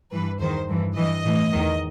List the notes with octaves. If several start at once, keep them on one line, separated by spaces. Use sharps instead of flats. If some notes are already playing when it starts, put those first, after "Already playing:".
G2 E3 B4
E2 D#3 C5
G2 E3
G2 E3 D#5
A2 E3
E2 D#3